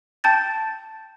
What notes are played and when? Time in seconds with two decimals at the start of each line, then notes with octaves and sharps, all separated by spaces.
0.24 G5 A5 G6 A6